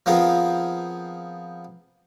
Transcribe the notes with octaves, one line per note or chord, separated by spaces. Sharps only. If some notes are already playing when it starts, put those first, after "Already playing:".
F3 B3 C4 F4 G#4 A#4